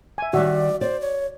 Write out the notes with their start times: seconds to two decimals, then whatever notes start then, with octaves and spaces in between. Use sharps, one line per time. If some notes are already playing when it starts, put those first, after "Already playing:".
0.18 E5 G#5
0.33 D#3 G3 F#4 D5 E5
0.81 C5 D5
1.01 C#5